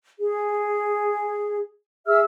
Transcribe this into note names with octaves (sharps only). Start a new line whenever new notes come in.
G#4
G#4 E5 E6 F6